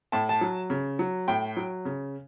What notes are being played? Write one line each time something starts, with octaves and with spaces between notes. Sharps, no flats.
A2 A5
A5
F#3
C#3
F#3
A2 G5
F#3
C#3